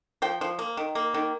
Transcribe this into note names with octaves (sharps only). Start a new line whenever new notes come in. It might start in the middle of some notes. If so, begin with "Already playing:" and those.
F3 G5
F3
A#3
D#3
A#3
D#3